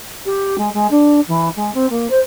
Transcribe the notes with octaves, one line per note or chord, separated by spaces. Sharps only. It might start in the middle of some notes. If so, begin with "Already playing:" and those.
G4
G#3
G#3
D4
E3
G#3
C4
A#3
C5